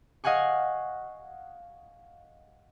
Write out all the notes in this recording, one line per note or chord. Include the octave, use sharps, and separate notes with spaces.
D#5 F5 F#5 G#5 C#6